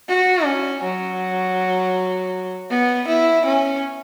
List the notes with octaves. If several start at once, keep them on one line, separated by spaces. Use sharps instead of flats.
F#4
C#4
F#3
B3
E4
C#4